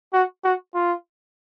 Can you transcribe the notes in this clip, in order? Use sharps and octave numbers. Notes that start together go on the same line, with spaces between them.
F#4
F#4
F4